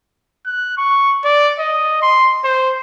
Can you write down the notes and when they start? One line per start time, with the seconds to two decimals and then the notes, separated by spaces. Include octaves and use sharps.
0.46 F#6
0.78 C#6
1.25 D5
1.59 D#5
2.02 C6
2.44 C5